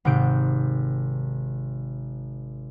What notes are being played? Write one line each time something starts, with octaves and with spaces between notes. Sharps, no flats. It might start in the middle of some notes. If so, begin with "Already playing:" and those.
G#1 C3 G6 D7